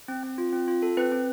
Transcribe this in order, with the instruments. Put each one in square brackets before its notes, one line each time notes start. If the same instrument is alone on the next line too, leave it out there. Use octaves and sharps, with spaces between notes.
[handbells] C4
C4
F4
C4
F4
A4
C4 B4
C4